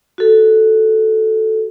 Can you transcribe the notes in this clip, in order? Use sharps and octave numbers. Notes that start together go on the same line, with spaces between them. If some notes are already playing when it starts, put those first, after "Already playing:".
F#4 A4